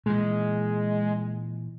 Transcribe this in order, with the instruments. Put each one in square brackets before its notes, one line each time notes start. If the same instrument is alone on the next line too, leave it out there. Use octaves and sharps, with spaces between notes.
[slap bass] A#2 E3 [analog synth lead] G#3